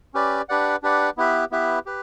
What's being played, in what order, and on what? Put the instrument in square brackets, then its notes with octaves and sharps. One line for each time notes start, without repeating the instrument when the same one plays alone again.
[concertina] C#4 G4 B4 D5
D4 G4 B4 D5 F#5
D4 G4 B4 D5 F#5
B3 E4 G4 B4 E5
B3 E4 G4 B4 E5
G4 B4